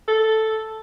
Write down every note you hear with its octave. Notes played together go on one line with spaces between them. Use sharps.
A4